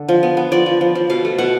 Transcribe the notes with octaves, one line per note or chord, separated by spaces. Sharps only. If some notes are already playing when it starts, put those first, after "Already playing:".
Already playing: D3
F3
B3
B3
F3 D5
F3
F3
F3
B2 F5
A3
B2 F#5